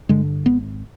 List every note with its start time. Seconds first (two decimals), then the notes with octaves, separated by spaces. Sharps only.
0.09 G2 D3 G#3
0.46 G#1 B3